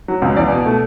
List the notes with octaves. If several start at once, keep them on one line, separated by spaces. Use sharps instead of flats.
F#3
C#2
E2 D5
B2
A3